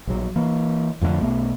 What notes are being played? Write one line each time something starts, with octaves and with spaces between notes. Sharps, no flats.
A#1 F#3
E3 A#3
F2 A2 D3
B1 A3 B3